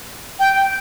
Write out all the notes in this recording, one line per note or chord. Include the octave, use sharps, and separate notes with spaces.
G5